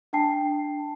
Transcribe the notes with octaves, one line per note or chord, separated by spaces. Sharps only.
D4 G5 A5 C7